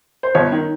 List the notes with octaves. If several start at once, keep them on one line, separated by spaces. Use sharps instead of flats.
C5
G1 C#5
D#3